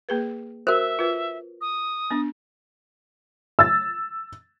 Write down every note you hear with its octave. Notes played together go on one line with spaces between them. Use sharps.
A#3 G#4 B4
F#4 A#4 C5 E5
F4 B4
D#6
B3 D4
E6 A6